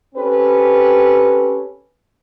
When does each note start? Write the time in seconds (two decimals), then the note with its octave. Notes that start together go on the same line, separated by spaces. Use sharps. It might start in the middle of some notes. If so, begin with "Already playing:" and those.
0.15 C4 C#4 G4 A4 B4